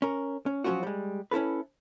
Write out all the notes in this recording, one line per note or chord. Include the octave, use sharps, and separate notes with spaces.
C#4 A#4
C#4
F3 F#3 G#3 C#4 F4 F#4
G3 G#3
C#4 E4 F4 A4 B4